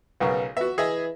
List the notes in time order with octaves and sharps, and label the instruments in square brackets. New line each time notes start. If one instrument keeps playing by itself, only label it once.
[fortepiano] B1 C#3 A#4 [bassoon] B3
[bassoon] B3 [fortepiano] F#4 E5
[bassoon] E3 [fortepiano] G#4 D#5 E5